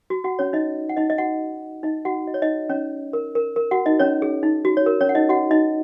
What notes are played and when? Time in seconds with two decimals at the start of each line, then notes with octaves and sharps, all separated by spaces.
0.10 F#4
0.24 F#4 F#5
0.39 C#4 C#5
0.53 D#4 D#5
0.89 F#5
0.97 D#4 D#5
1.10 D#5
1.18 F#4 F#5
1.83 D#4 D#5
2.05 F#4 F#5
2.27 D#5
2.34 C#5
2.42 D#4 D#5
2.69 C#4 C#5
3.13 A#4
3.35 A#4
3.56 A#4
3.71 F#4 F#5
3.86 D#4 D#5
3.99 C#4 C#5
4.22 G#4
4.43 D#4
4.65 F#4
4.77 C#5
4.86 A#4
5.01 C#4 C#5
5.09 F#5
5.15 D#4 D#5
5.29 F#4 F#5
5.51 D#4 D#5